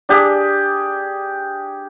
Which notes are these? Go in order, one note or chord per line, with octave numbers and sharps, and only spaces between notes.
D4 G4 G#4